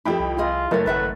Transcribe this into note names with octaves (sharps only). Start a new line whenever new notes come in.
F2 E4 G4 A4 G5 B5
C2
E4 F4 G#4 D#5
F#1 A3 A#4 C#5 A6
G#1 F#3 B4 E5 F#5